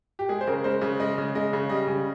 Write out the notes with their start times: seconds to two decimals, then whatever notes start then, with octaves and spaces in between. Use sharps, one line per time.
0.19 G4
0.29 G#3 G#4
0.41 C5
0.47 C#3 A#4
0.64 G#3 C5
0.81 C#3
1.00 G#3 D#5
1.18 C#3
1.35 G#3 D#5
1.53 C#3
1.69 G3 D#5
1.88 C#3